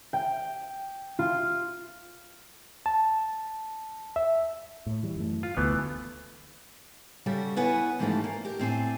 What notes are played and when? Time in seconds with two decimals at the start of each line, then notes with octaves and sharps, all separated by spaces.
0.13 G5
1.19 F4
2.86 A5
4.16 E5
4.87 A2
5.03 E3 G3
5.16 F#2 E3 A3
5.43 F4
5.57 F1 D2 E3 A3 B3
7.26 C#3 G3 F#4 G4 A4
7.56 B3 E4 B4 C#5 F#5 G#5
7.99 G#2 E3 F3 A3 C#4 G4
8.24 A#3
8.45 G4 A#4
8.59 A2 C4 D4 G#5